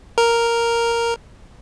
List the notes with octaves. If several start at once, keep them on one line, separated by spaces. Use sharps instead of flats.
A#4